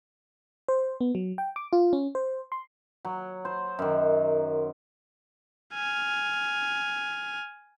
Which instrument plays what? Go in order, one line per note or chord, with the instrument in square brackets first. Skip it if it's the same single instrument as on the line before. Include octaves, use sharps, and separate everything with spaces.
[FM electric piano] C5
B3
F#3
G5
D6
F4
C#4
C5
C6
[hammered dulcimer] F#3
C5
F#2 D#3
[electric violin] G#5 F6